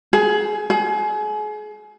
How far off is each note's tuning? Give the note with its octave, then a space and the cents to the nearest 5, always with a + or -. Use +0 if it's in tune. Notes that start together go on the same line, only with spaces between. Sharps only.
G#4 +20
G#4 +35